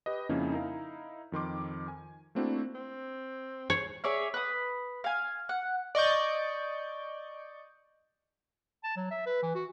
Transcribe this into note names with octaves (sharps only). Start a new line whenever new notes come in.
G4 B4 D#5
F2 C#3 A#3 C#4 D#4 E4
D#4 E4 A#4 F5
F2 D#3 C6 D6
G#5
A3 A#3 C4 D4 E4 F#4
C4
C5 C#5
G#4 C#5 D5 E5
B4 D#6
F5 G#5
F#5
D5 D#5 C#6 G6
A5
F#3
E5
B4
E3
F#4